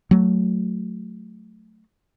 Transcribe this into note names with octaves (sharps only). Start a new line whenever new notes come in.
F#3 A3